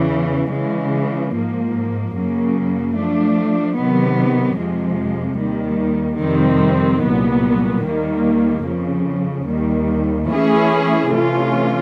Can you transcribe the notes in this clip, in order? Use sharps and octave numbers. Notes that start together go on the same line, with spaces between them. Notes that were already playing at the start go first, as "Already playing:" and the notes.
Already playing: E2 C#3 E3
C#3 E3 G#3
G#2 F3 A#3
F#2 C#3 F#3 A#3
F3 A3 D4
C3 D#3 F#3 B3
F2 C3 F3 G#3
D#2 D#3 G3
F2 C3 D#3 G3 C4
C2 A#2 F#3 B3
D#2 D#3 G3 A#3
F2 C#3 F3
D#2 D#3 G3
E3 A3 C#4 E4 G#4
C3 E3 A3 C#4 F4